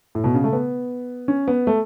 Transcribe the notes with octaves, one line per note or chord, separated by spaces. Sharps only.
A2
B2
C#3
A3
B3
C#4
B3
A3